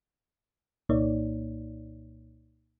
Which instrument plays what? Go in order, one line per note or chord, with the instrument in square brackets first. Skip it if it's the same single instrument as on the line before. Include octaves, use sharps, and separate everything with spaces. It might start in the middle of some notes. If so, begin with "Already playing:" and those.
[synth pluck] C2 A#2 A#3 D#4 C#5 D5